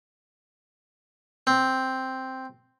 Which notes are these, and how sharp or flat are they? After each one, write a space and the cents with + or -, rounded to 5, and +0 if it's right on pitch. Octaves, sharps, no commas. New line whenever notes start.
C4 +0